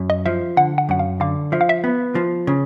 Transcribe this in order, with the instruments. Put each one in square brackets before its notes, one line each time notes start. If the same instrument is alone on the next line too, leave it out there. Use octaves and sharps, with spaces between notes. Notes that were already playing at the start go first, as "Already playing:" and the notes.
Already playing: [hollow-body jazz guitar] F#2
[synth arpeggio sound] D#5
[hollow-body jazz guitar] F3 [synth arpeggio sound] E5
[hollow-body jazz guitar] D3 [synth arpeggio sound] F#5
[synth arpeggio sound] F#5
[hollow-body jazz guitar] F#2 [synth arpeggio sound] F#5
[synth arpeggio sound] F5
[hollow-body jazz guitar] D3 [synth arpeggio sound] F5
[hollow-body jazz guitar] F3 [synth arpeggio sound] E5
[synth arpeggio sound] F5
E5
[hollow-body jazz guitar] B3
F3
C#3